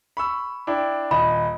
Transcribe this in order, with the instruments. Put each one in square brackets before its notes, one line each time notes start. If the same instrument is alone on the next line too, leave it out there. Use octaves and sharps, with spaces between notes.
[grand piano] B5 C#6 E6
D4 E4 G5
[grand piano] D#1 D#5 [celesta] B5